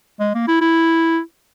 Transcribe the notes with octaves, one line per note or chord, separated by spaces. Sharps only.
G#3
A#3
E4
E4